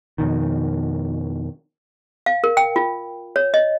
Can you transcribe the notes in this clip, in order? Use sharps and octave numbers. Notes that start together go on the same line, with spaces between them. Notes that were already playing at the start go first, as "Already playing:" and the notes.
F2 B2 D#3
F5
A#4
G5
F4
C#5
D#5